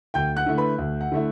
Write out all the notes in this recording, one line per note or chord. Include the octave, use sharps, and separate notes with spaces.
D2 G5 G6
F#5 F#6
D3 A3 E4
B4 B5
D2
F#5
D3 A3 E4